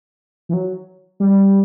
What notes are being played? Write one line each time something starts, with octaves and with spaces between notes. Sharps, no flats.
E3
F#3
G3